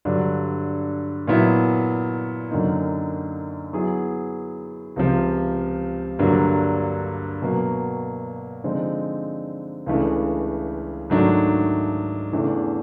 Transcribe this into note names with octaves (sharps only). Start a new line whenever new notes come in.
G2 D3 F#3
A#2 F#3 B3 E4
F#2 D3 F#3 A#3 D#4
F#3 B3 E4 G#4
C#2 C3 F3
G2 D3 F#3 A#3
B2 F#3 A#3
D3 F3 G#3 C4 D#4
C#2 C#3 E3 A3 D4
G#2 D#3 F#3 A3 D4
E2 C#3 E3 A3 D4